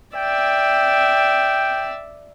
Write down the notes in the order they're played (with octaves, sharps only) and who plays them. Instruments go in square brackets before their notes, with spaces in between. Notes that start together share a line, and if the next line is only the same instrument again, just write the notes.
[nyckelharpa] D5 E5 [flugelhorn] G5